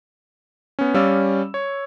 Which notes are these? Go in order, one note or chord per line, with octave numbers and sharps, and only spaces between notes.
B3 C#4
G3 C#4 D5 F5 E6
C#5